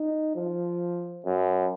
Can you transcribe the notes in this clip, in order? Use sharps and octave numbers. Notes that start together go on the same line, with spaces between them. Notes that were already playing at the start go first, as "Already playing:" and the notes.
Already playing: D#4
F3
F#2